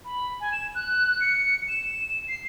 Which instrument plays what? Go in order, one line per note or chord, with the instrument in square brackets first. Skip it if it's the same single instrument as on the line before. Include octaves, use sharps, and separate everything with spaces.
[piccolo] B5
G#5
E7
F#6
C#7
E7
C7